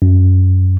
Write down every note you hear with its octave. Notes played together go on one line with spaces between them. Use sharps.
F#2